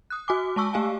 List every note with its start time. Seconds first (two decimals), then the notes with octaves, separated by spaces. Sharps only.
0.10 D#6 F#6
0.28 F#4 G#5 D6
0.56 G#3 A5 C#6 E6
0.73 A3 G4 F5 G#5 A5